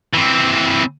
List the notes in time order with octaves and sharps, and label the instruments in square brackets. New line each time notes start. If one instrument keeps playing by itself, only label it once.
[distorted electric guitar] E3 C4